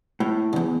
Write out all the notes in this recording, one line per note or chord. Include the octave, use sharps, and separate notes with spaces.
A2
B1 E2